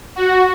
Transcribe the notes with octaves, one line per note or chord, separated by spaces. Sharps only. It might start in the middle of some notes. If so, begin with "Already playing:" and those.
F#4